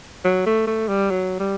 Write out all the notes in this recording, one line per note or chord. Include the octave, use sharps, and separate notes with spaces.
F#3
A3
A3
G3
F#3
G3